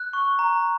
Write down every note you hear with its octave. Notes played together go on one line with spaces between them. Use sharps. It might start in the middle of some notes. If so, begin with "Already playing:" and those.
Already playing: F#6
C#6
A#5